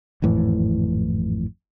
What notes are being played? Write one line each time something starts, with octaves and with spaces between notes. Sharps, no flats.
G#1 F2 A2 E3